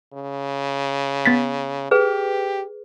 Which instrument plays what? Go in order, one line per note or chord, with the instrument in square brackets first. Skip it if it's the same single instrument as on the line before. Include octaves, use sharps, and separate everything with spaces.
[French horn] C#3
[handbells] B3 A6 B6
[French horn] G4 [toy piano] G#4 B4